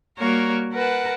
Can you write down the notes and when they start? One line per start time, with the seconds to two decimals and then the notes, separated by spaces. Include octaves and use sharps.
0.18 G3 A#3 F#4 A#4 C#5
0.72 A#4 B4 F#5 A5